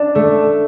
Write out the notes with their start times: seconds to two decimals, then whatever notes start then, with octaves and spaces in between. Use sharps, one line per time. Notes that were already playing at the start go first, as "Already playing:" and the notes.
Already playing: D4 D5
0.15 A3